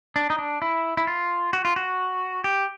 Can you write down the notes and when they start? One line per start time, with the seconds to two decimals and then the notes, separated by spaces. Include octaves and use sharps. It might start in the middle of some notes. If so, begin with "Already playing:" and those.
0.16 D4
0.30 D#4
0.39 D4
0.62 E4
0.97 E4
1.07 F4
1.53 F#4
1.65 F4
1.76 F#4
2.44 G4